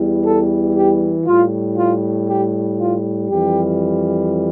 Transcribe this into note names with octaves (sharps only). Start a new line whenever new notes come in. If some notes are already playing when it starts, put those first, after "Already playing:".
Already playing: E2 E3 G3
A4
G4
A2 G3 F4
F4
G4
F4
F2 E3 G3 G4